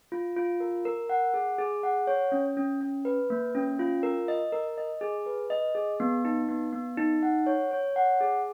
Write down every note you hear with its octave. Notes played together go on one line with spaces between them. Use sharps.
F4
F4
A#4
A#4
F#5
G#4
G#4
F#5
C#5
C#4
C#4
C#4
B4
A#3
C#4
F4
A#4
D#5
A#4
D#5
G#4
B4
D#5
G#4
B3
D#4
B3
B3
D#4
F#5
C#5
C#5
F#5
G#4